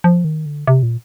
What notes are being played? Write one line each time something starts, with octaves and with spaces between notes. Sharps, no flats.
F3
D#3
D3
C3
A#2